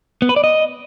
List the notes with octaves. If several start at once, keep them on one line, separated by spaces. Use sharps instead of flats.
B3
B4
D5
D#5